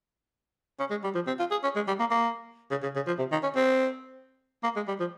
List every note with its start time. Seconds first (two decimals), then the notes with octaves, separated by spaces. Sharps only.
0.80 C#4
0.91 G#3
1.04 G3
1.15 F3
1.27 C4
1.39 F4
1.51 G#4
1.64 C#4
1.75 G#3
1.88 G3
2.00 A#3
2.11 A#3
2.71 C#3
2.83 C#3
2.96 C#3
3.07 F3
3.19 C3
3.32 D#3
3.43 C#4
3.55 C4
4.63 A#3
4.76 G#3
4.88 G3
5.00 F3